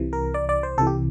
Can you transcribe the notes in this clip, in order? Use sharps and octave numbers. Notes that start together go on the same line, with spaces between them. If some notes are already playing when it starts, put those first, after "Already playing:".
Already playing: C2 C3 E3
A#4
D5
D5
C5
C2 C3 E3 A4
G4